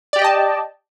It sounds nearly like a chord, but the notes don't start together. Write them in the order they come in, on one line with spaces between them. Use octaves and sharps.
D5 G4 G5 D#5 A5